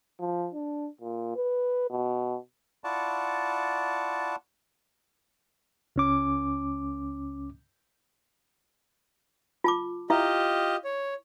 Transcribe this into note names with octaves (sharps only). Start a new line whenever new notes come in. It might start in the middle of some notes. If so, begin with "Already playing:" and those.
F3
D4
A#2
B4
B2
E4 F4 D5 F#5 A5 C#6
C#2 C#4 D6
F4 A5 D6
E4 F4 G4 D#5 E5
C#5